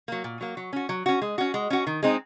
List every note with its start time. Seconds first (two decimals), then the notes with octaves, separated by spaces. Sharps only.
0.08 F#3 A#3
0.24 A#2
0.41 F#3 A#3
0.57 F#3
0.73 C#4 F#4
0.89 F#3
1.06 C#4 F#4
1.22 G#3
1.38 C#4 F#4
1.54 G#3
1.70 C#4 F#4
1.87 D#3
2.03 G#3 C4 D#4